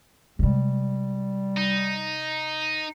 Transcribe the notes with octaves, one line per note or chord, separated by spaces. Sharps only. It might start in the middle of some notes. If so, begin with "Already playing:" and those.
C3 G3 G#3
D#4